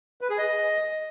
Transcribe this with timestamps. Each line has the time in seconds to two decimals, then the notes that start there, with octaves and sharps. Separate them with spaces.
0.21 B4
0.30 G#4
0.38 D#5